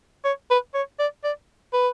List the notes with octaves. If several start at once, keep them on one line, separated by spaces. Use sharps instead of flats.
C#5
B4
C#5
D5
D5
B4